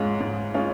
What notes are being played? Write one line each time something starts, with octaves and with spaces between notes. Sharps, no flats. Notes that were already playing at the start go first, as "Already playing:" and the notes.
Already playing: G#2 G#3 C#4 F4
G#2
G#3 C#4 F4